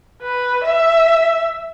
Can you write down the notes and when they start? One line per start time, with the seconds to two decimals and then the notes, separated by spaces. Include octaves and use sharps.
0.22 B4
0.64 E5